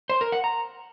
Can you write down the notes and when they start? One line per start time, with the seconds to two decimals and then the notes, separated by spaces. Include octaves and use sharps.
0.09 C5
0.21 A#4
0.32 F#5
0.44 A#5